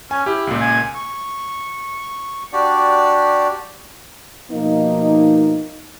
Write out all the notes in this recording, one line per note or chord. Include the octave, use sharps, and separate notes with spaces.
C#4 G#5
E4 G4
C#2 A#2
G#5
C#6
D4 F#4 G4 D5
B2 F3 A#3 D#4